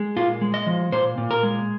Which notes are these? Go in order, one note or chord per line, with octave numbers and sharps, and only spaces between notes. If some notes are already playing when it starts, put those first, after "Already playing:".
Already playing: G#3
A#2 F4
G#3
D#5
F3
A#2 C5
A#2
A#4
G#3